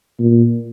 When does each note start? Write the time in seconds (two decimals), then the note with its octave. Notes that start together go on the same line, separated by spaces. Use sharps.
0.19 A#2